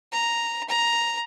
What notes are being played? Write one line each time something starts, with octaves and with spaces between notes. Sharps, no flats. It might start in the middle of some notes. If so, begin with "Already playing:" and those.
A#5
A#5